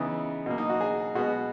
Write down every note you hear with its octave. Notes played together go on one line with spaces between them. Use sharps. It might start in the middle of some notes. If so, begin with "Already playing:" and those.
Already playing: C#3 E3 B3 D#4
B2 A#3
D#4
F#4
G#4
B2 G#3 B3 F#4